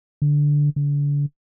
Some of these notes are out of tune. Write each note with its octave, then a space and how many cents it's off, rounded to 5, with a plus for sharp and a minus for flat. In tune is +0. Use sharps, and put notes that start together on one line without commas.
D3 -5
D3 -35